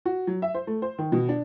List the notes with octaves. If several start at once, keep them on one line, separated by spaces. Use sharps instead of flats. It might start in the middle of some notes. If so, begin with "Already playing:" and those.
F#4
F#3
E5
C5
A3
C5
D#3
B2
D4